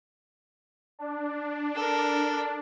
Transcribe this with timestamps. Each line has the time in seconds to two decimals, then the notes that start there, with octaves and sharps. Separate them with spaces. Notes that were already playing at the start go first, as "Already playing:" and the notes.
0.99 D4
1.75 A4 A#4